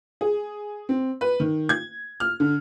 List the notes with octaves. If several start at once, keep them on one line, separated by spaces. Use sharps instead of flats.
G#4
C4
B4
D#3
G#6
F6
D3